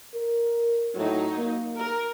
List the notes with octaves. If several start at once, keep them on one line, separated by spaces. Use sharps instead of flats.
A#4
A2 F#3 D#4
A#3
A#4